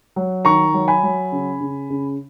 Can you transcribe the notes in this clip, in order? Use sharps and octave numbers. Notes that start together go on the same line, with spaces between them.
F#3
D#3 A#5 C#6
F#3
G#5 B5
F#3
C#3
C#3
C#3